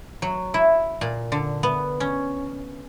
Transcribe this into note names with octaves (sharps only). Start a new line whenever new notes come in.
F#3
E4
A#2
D3
B3
C#4